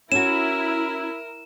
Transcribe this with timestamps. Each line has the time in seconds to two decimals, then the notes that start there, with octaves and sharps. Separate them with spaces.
0.12 C#4 E4 F#4 A#4 E7